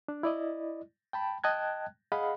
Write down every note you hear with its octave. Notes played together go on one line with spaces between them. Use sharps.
D4
E4 D5 D#5
G5 A5 B5
D#5 G5 A5 F#6 G#6
G#4 D#5 F5 F#5 B5